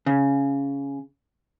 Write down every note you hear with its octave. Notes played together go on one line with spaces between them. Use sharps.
C#3